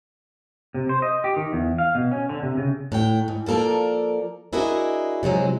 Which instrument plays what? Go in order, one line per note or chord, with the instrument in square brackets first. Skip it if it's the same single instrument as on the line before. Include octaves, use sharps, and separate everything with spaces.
[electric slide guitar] C3
C5
D#5
G4
D#3
E2
F5
B2
C#4
D3
C3
C#3
[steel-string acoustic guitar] A2 F#5 G5
G#2
F3 A#3 A4 A#4 D5
D4 E4 F#4 G#4 A#4 D#5
C3 E3 F#3 G#3